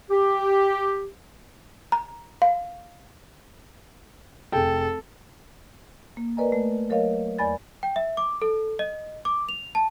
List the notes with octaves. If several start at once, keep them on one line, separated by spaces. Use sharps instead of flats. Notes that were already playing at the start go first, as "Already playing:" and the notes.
G4
A#5
F5
F1 G#4 A4 G5
A#3
A#4 B4 D5 D#5 G#5 A#5
A3
F#3 A#4 C#5 D#5 F5
E2 D5 G#5 B5 A6
G5
E5
D6
A4
D#5
D6
F7
A5